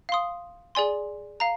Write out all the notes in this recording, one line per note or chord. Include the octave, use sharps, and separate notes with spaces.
F5 C6 D#6
G#4 D5 G#5 C6
F5 A#5